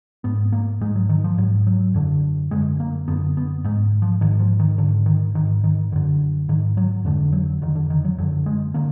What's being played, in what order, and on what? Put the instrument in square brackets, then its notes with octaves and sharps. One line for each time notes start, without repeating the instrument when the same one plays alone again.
[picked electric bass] G#2 B3
A#3
G#2 G#3
F#3
D#3
F3
G#2 F#3
F#3
F#2 D3
F#2 D3 G#3
A#3
F#2 D3 B3
B3
G#2 G#3
F3
G#2 D#3
F3
D#3
G#2 D3
D#3
G#2 D#3
D#3
F#2 D#3
D3
G#2 D#3
F#3
F2 D3 G#3
F#3
F2 D3 D#3
D3
D#3
F#3
F#2 D3 F#3
G#3
D3 A#3